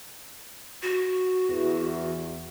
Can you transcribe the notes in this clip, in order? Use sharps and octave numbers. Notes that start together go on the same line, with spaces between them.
F#4
E2